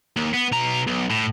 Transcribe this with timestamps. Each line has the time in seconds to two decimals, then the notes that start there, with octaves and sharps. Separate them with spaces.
0.16 D#2
0.33 B3
0.52 B2 A#5
0.87 B1
1.10 A2